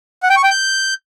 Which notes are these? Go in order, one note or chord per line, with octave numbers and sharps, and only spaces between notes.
F#5
G5
C#6
G5
G6